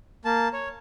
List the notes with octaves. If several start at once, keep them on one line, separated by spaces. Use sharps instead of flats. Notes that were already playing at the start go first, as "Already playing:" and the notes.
A#3 A5
C#5